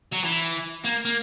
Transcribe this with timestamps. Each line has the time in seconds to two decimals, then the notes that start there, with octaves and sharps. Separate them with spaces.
0.12 F#3
0.24 E3
0.85 A#3
1.05 A#3